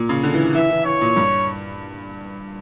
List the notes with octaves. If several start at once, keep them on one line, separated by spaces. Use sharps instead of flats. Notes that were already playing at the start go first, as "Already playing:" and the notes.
Already playing: A#2
C#3
D3
E3
E3 E5
E3
E3 C#5
A#2
G2